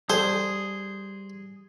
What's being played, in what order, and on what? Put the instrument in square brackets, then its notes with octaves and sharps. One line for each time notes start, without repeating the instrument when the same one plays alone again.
[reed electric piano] G3 [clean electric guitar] G#4 [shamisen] A4 [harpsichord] C5